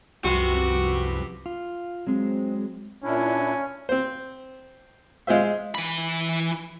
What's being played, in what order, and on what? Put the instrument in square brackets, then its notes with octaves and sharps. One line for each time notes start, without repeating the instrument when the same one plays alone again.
[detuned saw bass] C2 [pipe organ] F#2 F3 B4 [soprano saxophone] F#4 [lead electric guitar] G4 C6
[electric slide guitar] F4
[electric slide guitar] F#3 G#3 [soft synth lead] C4
[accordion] A#2 D4 E4 [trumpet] C#4
[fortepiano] C4 C5
G#3 F4 C5 E5
[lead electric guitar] E3 B5